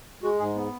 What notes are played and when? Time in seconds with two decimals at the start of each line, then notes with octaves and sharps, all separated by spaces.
0.23 G#3 F#4
0.39 G#2 G#4
0.55 B3